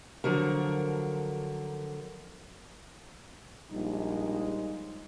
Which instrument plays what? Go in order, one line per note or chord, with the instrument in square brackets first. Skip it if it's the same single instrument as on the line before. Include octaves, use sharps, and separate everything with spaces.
[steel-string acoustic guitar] D3 F3 F#3 A#4
[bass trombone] A#1 [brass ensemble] G3 G#3 D#4